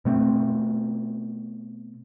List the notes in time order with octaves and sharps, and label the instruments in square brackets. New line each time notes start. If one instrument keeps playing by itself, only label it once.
[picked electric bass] B2 A3 B3 C4